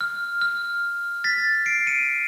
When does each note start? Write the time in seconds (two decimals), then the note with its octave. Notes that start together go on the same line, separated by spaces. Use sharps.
0.01 F6
0.41 F6
1.24 A6 B6
1.66 C7 D7
1.87 C#7 D#7